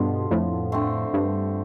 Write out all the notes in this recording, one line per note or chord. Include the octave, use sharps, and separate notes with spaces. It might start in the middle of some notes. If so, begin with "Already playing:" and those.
Already playing: G2 B2 D3 F3 B3 F4
F2 A2
D3 A3 C4
G2